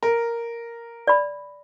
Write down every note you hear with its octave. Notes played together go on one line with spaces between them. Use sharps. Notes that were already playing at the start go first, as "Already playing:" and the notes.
A#4
D5 B5